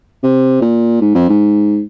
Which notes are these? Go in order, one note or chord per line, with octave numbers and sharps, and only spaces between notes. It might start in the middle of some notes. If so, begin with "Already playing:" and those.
C3
A#2
G#2
F2
G#2